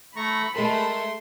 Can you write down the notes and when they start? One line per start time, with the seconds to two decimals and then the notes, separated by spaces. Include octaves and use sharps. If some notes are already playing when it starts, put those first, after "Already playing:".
0.16 A3 A#5 B5 C#6
0.56 G#3 A3 A#4 C6